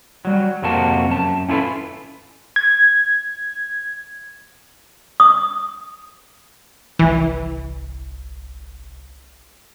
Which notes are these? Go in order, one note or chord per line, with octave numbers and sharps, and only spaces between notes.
F#3 G3
F2 C3 A#3 F#4 A5
F#2 A5
C#4 E4 F4 G#4 A4 B4
G#6
D#6
G1 C2 E3